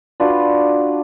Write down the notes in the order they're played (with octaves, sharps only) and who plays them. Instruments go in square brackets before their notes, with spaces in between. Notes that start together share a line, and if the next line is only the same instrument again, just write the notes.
[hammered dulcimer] D4 F4 F#4 B4